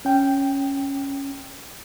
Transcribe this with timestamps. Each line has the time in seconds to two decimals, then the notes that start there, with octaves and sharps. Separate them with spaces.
0.05 C#4 G5